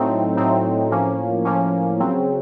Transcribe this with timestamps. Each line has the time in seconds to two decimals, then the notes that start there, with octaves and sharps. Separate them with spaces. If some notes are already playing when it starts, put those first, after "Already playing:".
Already playing: A2 F#3 A3 C4 D#4
0.37 A2 F#3 A3 C4 D#4
0.91 A2 F3 A#3 C#4
1.45 A2 F3 A#3 C#4
2.00 C#3 F#3 C4